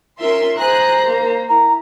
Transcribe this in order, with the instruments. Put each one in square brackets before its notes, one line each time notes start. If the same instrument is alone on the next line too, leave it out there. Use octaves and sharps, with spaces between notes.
[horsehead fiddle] C#4 F4 [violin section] A#4 E5 C6
[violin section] G#4 F#6 [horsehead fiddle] C5 A#5
[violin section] A#3
[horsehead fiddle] E4 [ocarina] A#5